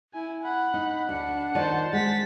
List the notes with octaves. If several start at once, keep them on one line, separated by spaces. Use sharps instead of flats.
E4 G#5
F#5 B5
D#4
D2 D4 F#5
D#3 F4 C5 D5 A5
G#3 F#5 A6 B6